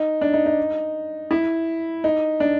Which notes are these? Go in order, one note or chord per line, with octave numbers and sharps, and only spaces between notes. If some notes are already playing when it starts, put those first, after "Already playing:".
Already playing: D#4
D4
D#4
D#4
E4
D#4
D4